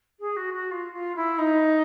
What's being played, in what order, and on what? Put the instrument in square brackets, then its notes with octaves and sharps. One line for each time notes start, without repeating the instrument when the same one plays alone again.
[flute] G#4
F#4
F#4
F4
F4
E4
D#4